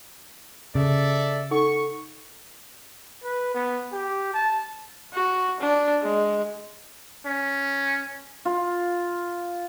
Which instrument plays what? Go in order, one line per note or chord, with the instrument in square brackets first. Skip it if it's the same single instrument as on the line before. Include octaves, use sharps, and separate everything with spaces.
[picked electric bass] C#3 [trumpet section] A4 D5 E5
[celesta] D#4 A4 F#5 [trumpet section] C#6
[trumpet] B4
B3
G4
A5
[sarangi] F#4
D4
G#3
[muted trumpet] C#4
[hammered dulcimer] F4